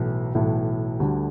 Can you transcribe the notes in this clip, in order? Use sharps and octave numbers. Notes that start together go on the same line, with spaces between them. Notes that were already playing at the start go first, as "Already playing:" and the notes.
Already playing: B1 A2 E3
B1 A2 E3
D2 D3 G3